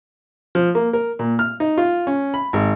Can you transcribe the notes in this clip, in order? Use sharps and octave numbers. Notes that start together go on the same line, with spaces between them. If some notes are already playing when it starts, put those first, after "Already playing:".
F3
A#3
A#4
A#2
F6
D#4
F4
C#4
B5
G#1